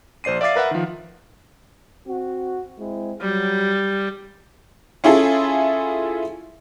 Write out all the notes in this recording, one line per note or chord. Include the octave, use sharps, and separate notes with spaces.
A#1 C5 D5 C7 D#7
D5 E5 F5 D6 A6 C7
A#4 B4 E5 F#5
D#3 F3
C4 F#4
G#3 C4 E4
F#3 G3
C#4 E4 F4 G#4 A4